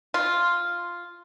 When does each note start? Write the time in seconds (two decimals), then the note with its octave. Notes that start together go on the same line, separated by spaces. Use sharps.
0.14 F4